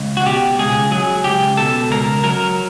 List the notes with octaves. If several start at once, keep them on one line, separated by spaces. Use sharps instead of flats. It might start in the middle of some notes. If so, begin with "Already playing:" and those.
Already playing: C#2
F#4
B2 G4
C#2 G#4
F#3 G#4
C#2 G4
B2 A4
C#2 A#4
F#3 A#4